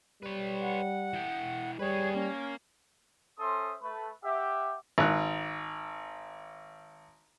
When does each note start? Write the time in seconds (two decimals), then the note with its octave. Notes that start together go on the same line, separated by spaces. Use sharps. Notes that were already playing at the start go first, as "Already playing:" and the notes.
0.23 G3 B4 C#5
0.61 F#5
1.13 E3 G5
1.79 G3 G#4 B4 C#5
2.14 A#3 C#4
3.39 C#4 A4 C5 E5 C6 D#6
3.82 A3 B4
4.24 G4 E5 F#5
4.98 G#1 F#6